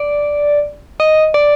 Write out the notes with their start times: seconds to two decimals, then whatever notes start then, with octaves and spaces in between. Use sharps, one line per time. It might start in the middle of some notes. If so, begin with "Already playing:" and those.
Already playing: D5
1.00 D#5
1.34 D5